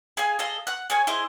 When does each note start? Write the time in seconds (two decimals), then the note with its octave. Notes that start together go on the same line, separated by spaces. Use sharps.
0.17 G#4 F5 G#5
0.39 G#4 A4 D#5 F5
0.67 F#5 F#6
0.90 G#4 C#5 G#5
1.07 E4 G#4 C5 D#5